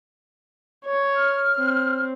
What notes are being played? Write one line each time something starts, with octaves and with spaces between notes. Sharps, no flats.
C#5
F6
C4